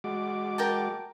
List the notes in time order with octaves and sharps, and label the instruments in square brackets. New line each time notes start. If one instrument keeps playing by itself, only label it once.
[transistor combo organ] G#3 F#4 D6
[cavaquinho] A#4 G5 A5